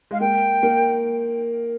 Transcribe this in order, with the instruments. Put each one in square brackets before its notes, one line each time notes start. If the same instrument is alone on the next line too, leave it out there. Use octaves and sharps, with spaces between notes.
[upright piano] G#3 [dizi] F5
[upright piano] A#3 [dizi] G5
[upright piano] A#3